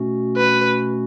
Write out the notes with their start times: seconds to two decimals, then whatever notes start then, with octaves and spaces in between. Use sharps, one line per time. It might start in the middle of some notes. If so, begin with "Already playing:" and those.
Already playing: B2 A3 C#4 F#4
0.37 B4